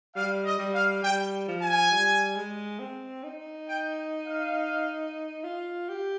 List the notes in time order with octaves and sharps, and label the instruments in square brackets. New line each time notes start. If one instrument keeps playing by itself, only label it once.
[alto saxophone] G3 [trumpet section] F5
[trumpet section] D#5
[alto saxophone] G3
[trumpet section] F5
[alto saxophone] G3 [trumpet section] G5
[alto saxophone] F3
[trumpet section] G#5
[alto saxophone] G3
G#3
C4
D#4
[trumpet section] G5
F5
[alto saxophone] F4
G4